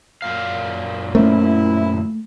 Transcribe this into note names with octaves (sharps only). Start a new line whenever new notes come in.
F#2 A#2 F5
A3 A#3 C#4 E4 A#4 C5